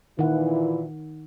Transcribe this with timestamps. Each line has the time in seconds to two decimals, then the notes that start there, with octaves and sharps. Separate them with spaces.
0.19 A#2 D#3 E3 E4 F#5